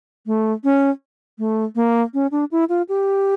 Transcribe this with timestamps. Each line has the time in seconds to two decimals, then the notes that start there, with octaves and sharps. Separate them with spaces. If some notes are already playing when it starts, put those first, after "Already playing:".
0.26 A3
0.64 C#4
1.38 A3
1.75 A#3
2.14 C#4
2.31 D4
2.51 E4
2.69 F4
2.89 G4